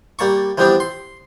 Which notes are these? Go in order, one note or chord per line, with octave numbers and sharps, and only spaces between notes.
G3 A#3 A5 C#6
E3 F3 G3 B3 C4 D4
C6